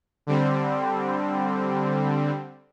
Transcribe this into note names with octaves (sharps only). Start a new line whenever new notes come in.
D3 G3 C4